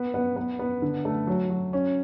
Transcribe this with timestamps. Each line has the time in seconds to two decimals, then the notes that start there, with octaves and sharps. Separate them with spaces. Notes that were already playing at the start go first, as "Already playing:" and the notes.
Already playing: B3
0.14 B3
0.36 B3
0.59 B3
0.82 D3
1.05 A3
1.27 F#3
1.50 F#3
1.73 C#4